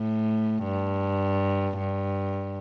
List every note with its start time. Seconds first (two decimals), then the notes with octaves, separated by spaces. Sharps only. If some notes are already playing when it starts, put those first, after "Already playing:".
Already playing: A2
0.63 G2
1.78 G2